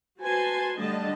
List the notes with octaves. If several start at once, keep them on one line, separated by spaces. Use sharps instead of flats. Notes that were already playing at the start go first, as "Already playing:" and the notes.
F#4 B4 C5 G#5 A5 C6
D3 G3 A3 D4 D#5 A5